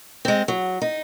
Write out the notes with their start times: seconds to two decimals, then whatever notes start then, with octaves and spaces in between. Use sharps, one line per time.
0.25 G#3 C4
0.48 F#3
0.82 D#4